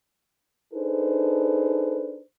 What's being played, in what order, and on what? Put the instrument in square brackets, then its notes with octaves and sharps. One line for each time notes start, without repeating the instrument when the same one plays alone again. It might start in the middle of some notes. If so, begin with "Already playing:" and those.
[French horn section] D4 D#4 G#4 A4 B4 C5